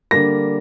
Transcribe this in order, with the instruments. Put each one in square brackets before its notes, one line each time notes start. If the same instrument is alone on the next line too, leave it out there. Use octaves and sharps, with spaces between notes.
[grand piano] D3 G3 A#3 A#6